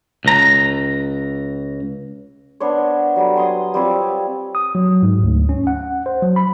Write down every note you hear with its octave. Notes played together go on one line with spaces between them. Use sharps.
C#2 A#5
B3 D4 C5 C#5
F#3 G3 A4
G#5 C6 D#6
G3 C4 F4 C#5
D#6
F#3
G#2
D2
C#4
F#5
C5
F#3
B5